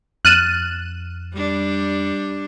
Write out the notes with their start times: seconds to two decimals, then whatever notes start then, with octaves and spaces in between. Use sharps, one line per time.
0.25 F2 F6 F#6 A6 D#7 E7
1.34 G3 D4